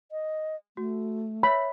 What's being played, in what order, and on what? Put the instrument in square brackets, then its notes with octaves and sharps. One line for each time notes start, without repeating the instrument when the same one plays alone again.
[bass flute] D#5
[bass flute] A3 [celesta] F#4
[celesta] C#5 E5 [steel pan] B5